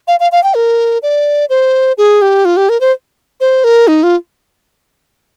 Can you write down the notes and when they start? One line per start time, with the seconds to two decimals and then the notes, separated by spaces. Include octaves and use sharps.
0.08 F5
0.20 F5
0.32 F5
0.43 G5
0.55 A#4
1.03 D5
1.50 C5
1.98 G#4
2.22 G4
2.45 F4
2.57 G4
2.69 A#4
2.81 C5
3.40 C5
3.64 A#4
3.88 D#4
4.03 F4